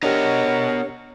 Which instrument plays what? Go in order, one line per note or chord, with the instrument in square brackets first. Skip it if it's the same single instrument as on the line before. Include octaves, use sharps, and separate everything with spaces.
[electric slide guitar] B3 D#5 A#5 [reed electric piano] D4 G4 [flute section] A#4 F#5 [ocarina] C#5